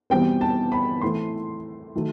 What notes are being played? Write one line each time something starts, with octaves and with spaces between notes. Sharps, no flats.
E2 B2 G3 C4 G5
A5
B5
A2 E3 A3 C4 C6
D#3 F#3 A3